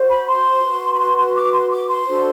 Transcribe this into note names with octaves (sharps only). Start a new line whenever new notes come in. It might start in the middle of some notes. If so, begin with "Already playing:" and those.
Already playing: F#4 C5
B5
C6
F#4 B4
B5
C6
C6
D6
C6
D6
C6
D4 F#4 A4 C5